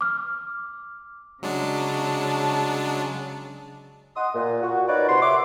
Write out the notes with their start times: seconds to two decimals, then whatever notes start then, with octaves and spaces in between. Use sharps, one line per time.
0.01 D6 F6
1.43 C#3 F#3 G#3 D4 A5
4.15 D#5 F#5 C6 D#6
4.35 A#2
4.62 F#4
4.88 D#4 F4 A#4 B4 C#5 D5
5.08 C3 C5 F#5 C6
5.22 E5 D6